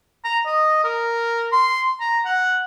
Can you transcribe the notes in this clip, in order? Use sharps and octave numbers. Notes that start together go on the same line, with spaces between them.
A#5
D#5
A#4
C6
A#5
F#5